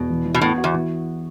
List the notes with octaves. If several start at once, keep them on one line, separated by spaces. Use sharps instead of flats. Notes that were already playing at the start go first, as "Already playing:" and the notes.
Already playing: E2 B2
E3
E3
B2
A2 B3
F#4
E2
E3